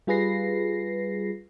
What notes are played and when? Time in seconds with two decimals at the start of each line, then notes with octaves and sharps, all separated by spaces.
0.07 G3 F4 G#4 B4 A#6 C7